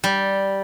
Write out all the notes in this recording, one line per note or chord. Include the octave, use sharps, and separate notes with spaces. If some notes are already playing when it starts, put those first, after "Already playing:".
G3